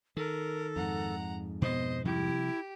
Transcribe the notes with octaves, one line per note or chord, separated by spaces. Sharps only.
D#3 A4 A#4
F2 G#2 F#5 A#5
B2 B3 C5 D#5
C3 F3 G3 E4 G4